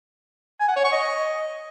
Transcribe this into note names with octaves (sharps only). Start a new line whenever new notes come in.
G#5
F#5
C#5
C#6
D#5